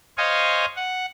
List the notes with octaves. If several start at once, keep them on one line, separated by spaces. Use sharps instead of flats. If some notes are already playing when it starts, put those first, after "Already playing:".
C5 C#5 D#5 F5 G#5
F#5